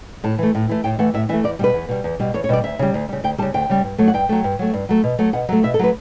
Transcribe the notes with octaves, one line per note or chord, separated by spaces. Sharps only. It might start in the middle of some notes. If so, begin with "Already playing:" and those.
A2 A5
E3 A3
A2
E3 A3
A2 G5
E3 A3 F#5
A2 E5
E3 A3 E5
E2 D5
B2 G3 B4
E2
B2 G3
E2
B2 G3
E2 C#5
C#5
B2 G3 D5
D2 E5
C#3 G3
D2
C#3 G3
D2 G5
C#3 G3 A5
D2 G5
C#3 G3
G2
F#3 A3
F#5
G2 G5
F#3 A3
G2
F#3 A3
G2
F#3 A3
B2
F#3 A3
B2 F#5
F#3 A3 E5
B2 E5
A4
F#3 A3 B4